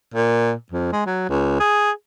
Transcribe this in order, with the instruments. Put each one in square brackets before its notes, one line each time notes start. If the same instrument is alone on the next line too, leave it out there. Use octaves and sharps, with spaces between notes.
[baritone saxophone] A#2
F2
G#3
F#3
C#2
G#4